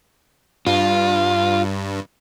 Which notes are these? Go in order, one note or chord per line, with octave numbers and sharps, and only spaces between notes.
G2 F4